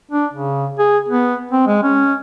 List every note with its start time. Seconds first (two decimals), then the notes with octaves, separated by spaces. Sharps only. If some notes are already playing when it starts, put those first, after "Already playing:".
0.11 D4
0.33 C#3
0.79 G#4
1.08 B3
1.51 C4
1.67 G#3
1.83 C#4